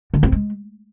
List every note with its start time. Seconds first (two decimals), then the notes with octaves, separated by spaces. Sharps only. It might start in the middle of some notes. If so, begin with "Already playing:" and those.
0.14 D3
0.23 C4
0.32 G#3